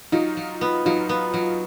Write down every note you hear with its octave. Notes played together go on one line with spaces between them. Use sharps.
F#3 D#4 F4
F#3
B3
F#3 D#4 F4
B3
F#3